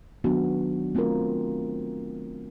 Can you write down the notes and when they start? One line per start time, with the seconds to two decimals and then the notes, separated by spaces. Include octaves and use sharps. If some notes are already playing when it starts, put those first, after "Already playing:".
0.24 D#3 F#3 B3 D4 F#4
0.95 A3 C4 F4 A#4